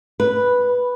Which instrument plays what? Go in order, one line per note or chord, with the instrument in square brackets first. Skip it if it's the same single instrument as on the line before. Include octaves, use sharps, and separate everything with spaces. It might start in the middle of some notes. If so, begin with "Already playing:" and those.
[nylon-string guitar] B4